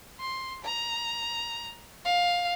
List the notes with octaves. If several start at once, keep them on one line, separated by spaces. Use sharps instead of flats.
C6
A#5
F5